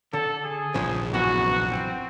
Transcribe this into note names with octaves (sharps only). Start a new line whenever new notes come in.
D3 A4
G#4
A#1 C#3 F3 G#3
F#2 E3 B3 F#4
C4